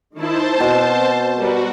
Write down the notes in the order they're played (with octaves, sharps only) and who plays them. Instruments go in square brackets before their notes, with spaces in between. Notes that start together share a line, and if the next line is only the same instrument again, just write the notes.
[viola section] D#3 D#4 E4 [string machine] C5 A5
[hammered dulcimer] B2 [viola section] C4
[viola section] G3 A#4 B4 [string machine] F#4